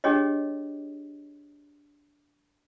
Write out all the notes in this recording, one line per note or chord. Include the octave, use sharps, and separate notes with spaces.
D4 G4 G#4 C#5 D#5